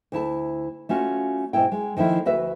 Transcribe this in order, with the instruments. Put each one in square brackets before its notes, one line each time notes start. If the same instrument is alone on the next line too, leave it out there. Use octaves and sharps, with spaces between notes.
[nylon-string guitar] D2 E4 A5
A3 C#4 F4 F#4
G#2 B2 E4 G5
G#3
D#3 F3 A3 E4
D2 F#4 B4 E5